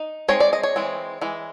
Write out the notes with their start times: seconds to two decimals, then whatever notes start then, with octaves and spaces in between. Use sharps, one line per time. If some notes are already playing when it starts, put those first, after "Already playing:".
Already playing: D#4
0.28 G#3 C4 D#4 C#5
0.40 D5
0.53 D#5
0.63 C#5
0.76 E3 G#3 C4
1.21 E3 G#3